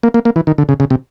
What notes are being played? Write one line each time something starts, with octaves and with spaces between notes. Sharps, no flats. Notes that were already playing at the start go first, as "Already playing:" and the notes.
A#3
A#3
A#3
E3
D#3
D3
C#3
C#3
C3